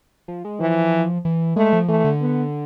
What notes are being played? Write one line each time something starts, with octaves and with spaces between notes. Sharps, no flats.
F3
G#3
E3 F3
E3
G#3 A3
F3
E3 A3
D3
B3